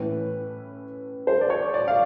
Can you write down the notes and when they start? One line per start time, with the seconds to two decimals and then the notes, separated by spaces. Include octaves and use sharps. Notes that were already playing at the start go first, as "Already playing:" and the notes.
Already playing: A2 E3 A3 C#4 B4
1.27 C5
1.41 D5
1.50 C#5
1.74 D5
1.88 F5